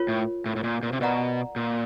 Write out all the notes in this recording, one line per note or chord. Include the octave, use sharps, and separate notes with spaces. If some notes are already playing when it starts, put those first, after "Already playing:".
Already playing: F4 A#4 C#5
A2
A2
A2
A#2
A#2
C3
B2 A#4 D5 F#5 A#5
A#2